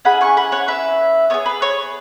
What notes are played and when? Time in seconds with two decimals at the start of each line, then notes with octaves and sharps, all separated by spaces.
0.05 C#4 E4 G#4 F#5 B5
0.21 G#5 C#6
0.37 F#5 B5
0.52 C#5 F#5
0.68 B4 E5
1.30 B3 G#4 C#5
1.46 B4
1.62 C#5